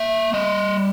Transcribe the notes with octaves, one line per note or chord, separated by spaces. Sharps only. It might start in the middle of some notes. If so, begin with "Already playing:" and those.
Already playing: A#3 E5
G3 D#5